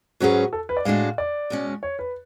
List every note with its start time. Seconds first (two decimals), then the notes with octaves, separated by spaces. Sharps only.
0.20 G#2 F#3 C#4 F#4 G#4 B4
0.53 A4
0.69 B4
0.77 D5
0.85 A2 G#3 D4 F#4 F5
1.18 D5
1.50 B2 G#3 C#4
1.83 C#5
1.99 B4